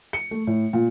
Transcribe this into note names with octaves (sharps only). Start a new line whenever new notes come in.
C#7
A3
A2
A#2